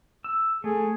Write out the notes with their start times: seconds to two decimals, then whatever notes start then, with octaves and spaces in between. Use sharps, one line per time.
0.24 E6
0.64 A3 G#4